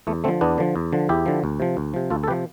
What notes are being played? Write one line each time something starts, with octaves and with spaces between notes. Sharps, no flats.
E2 A3
D3 F3 A3 C4
E2 B3 D4
D3 F3
E2
D3 F3
E2 E4 G4
D3 F3
D2
C3 F3
D2
C3 F3
D2 F4 A4
A4
C3 F3 G4 B4